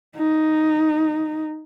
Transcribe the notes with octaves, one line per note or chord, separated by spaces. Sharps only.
D#4